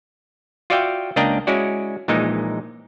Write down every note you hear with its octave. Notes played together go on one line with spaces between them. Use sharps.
F4 F#4 D5 E5 F5 G5
C#2 A#3 D4 D#5 G5 A#5
G#3 C#4 E4 F#4 D5
A#1 A#2 E3 G#3 D#4